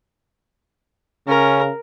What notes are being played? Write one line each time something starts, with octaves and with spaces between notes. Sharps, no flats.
C#3 C#4 A#4